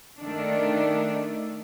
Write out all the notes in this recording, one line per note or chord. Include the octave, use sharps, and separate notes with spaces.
D#3 A3 D4